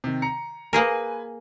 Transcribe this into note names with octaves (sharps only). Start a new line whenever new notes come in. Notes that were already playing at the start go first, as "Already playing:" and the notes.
C3 D#3
A#5 C#7
A#3 G#4 A#4 B4 G#5